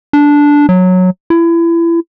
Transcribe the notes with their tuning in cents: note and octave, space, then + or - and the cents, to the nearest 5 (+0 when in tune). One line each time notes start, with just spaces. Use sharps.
D4 -10
F#3 -10
E4 +30